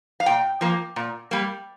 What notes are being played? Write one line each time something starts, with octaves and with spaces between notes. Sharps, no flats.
F5
A#2 G5
F3 A#3
A#2
G3 A#3